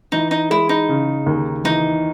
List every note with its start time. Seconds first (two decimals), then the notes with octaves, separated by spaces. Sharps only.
0.12 E3 D#4
0.31 D#4
0.50 G#3 E4
0.69 D#4
0.89 C#3
1.26 D#2
1.64 E3 D#4